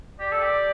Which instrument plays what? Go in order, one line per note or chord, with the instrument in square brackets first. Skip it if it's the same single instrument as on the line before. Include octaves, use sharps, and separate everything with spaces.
[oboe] G4 [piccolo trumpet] D5
[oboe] A4
G4